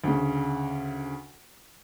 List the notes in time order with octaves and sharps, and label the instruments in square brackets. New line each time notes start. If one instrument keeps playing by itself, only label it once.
[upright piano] D2 C#3